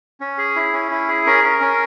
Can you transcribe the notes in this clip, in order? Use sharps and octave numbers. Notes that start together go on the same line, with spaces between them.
C#4
G#4
E4
C#4
E4
G#4
C#4 A#4
C#4
C#4